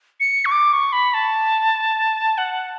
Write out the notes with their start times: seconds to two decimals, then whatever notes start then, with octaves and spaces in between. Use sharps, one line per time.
0.20 C#7
0.45 C#6
0.51 D6
0.73 C#6
0.93 B5
1.14 A5
2.38 F#5